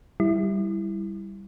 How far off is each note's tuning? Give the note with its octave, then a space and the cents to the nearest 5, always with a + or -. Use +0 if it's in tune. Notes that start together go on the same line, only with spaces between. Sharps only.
G3 +0 E4 +0